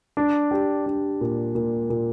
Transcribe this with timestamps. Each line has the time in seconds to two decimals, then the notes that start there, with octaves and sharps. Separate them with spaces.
0.17 D4
0.51 G4
0.86 D4
1.21 A#2
1.55 A#2
1.90 A#2